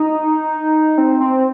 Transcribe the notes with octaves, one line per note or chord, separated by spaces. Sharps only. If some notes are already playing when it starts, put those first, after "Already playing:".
Already playing: D#4
C4
C4